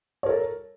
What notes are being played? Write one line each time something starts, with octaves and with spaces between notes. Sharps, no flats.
A4 A#4 C#5